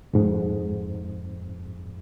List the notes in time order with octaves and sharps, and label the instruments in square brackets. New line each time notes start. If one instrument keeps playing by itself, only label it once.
[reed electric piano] F2 G#2